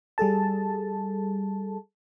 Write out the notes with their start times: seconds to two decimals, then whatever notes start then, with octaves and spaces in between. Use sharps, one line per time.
0.18 G3 G#4 A4 A5